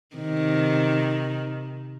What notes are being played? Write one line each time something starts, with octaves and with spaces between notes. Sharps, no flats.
C3 D#3